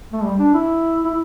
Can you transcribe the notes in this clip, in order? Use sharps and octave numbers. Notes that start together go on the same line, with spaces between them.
A3
G3
D4
E4
E4